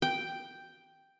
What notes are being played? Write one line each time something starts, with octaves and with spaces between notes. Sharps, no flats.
G5